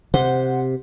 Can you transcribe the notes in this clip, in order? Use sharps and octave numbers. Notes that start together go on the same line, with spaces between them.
C3 C5 F#5